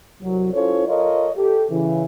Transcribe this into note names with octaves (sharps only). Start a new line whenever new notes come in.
C2 F#3
C#4 E4 F4 A4 C5 C#5
F4 A4 A#4 C#5 D#5
G4 A4
C#3 E3